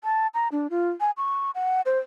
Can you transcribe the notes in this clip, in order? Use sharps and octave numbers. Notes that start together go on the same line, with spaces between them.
A5
A#5
D4
F4
G#5
C#6
F#5
C5